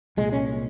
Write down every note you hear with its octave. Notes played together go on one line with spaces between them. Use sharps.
C2 A#2 G#3
C#4